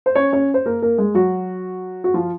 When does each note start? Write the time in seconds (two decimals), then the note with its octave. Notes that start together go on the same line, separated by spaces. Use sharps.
0.06 C5
0.15 C#4 C#5
0.33 C#4 C#5
0.54 C5
0.66 A#3 A#4
0.82 A#3 A#4
0.98 G#3 G#4
1.14 F#3 F#4
2.04 F#4
2.14 F3 F4